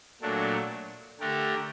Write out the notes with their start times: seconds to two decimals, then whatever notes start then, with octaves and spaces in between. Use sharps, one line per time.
0.21 A#2 F#3 A3 D4
1.20 D3 A3 D4 G4 A#4